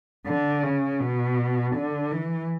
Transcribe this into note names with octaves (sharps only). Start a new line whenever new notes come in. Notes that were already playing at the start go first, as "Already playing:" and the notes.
D3
C#3
B2
D3
E3